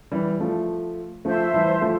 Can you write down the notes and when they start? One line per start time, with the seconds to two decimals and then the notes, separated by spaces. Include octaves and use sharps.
0.12 E3 G3
0.40 F3 A3
1.25 F3 A3 C5 E5 A5 C6
1.54 E3 G3
1.82 F3 A3